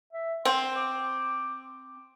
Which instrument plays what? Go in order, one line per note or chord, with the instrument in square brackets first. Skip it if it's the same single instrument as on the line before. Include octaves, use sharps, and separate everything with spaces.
[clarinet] E5
[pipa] C4 [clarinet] C6
[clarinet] D6